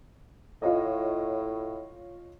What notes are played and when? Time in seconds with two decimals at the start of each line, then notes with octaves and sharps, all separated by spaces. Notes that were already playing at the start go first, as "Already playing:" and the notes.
0.62 A2 F4 C#5 D#5